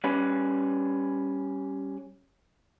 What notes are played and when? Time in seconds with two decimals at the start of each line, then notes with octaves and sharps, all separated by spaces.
0.04 G3 C#4 B4